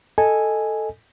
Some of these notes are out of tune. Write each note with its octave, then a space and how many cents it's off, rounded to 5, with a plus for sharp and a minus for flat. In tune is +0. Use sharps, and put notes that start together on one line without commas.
A4 +0 D#5 +0 G#5 +0